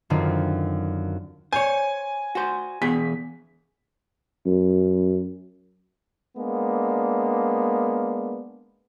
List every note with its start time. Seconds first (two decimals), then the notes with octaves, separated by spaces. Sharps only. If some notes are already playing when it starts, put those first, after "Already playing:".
0.10 F#2 D3 D#3 C4 F4
1.53 C5 C#5 G#5
2.35 F#4 C5
2.82 E2 B2 G#4 B6
4.46 F#2
6.37 G#3 A#3 B3 D4